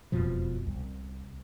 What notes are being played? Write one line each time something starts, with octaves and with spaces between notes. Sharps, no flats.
E1 F2 B2 F3
C2